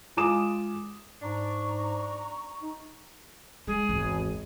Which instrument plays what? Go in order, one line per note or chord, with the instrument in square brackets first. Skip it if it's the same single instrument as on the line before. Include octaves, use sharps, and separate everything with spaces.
[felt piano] G#3 F4 G#5 D6 D#6 E7
[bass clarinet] G#2 [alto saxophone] D4 [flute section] A#5 C#6
[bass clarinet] D#4
[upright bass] G#3 [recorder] G#4
[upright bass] G#1 E2